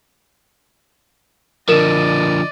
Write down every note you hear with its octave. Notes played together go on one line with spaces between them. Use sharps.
D3 F3 A#4 D5 D#5 E7